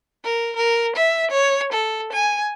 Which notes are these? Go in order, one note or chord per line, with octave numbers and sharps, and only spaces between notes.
A#4
A#4
E5
C#5
A4
G#5